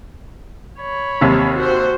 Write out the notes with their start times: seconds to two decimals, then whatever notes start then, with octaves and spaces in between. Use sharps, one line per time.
0.79 C#5 B5
1.21 D#2 C3
1.55 F#4 C5